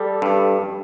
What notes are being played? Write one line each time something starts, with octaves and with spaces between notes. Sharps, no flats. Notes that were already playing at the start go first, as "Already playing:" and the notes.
Already playing: G3 A4
G2